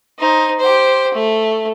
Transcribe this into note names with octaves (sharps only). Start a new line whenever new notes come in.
D#4 C5
G4 C5
A3